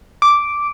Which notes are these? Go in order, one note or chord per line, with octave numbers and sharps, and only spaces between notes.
D6